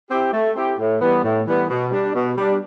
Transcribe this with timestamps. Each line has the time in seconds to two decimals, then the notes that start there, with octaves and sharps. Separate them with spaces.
0.11 C4 E4 G4
0.33 A3
0.56 C4 E4 G4
0.79 A2
1.01 E3 G3 B3
1.24 A2
1.47 E3 G3 B3
1.70 B2
1.92 G3 D4
2.15 B2
2.37 G3 D4